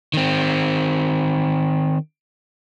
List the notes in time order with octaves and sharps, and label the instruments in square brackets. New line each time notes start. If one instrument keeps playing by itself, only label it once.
[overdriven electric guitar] D#3 C4